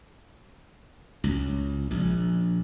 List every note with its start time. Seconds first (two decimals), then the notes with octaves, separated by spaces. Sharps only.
1.24 C#2
1.91 A#1